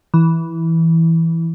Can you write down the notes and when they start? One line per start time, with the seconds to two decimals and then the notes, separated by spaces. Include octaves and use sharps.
0.14 E3